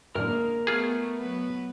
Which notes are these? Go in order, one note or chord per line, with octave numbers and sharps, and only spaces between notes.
F#2 A2 D3 G#3 A#3 A#4 F6
A3 B3 F4 G#4
F#3 B3 B4